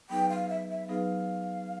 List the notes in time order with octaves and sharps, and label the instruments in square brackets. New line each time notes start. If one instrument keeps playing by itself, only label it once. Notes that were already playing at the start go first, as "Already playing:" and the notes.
[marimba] F#3 B3 D#4 G#4 B4 [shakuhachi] G5
[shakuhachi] F5
E5
E5
[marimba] F#3 B3 D#4 G#4 B4 [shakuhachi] F5